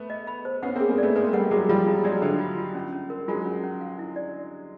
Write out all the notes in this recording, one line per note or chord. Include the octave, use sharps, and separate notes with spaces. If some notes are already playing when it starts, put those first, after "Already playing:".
Already playing: A3 B3
D#5
B5
C5
B3 C#4 F#5
A#3 C4 G#4
G#3 A#3
A3 B3 D5
G#3 A#3 B4
G3 A3 F#5
F#3 G#3 G#4
F3 G3 F4
F#3 G#3 F4
F#3 G#3 D5
D3 A4
F4
F4
C#4
C#4
A#4
F#3 G#3 F4
C#4
C#4
F5
E4
D5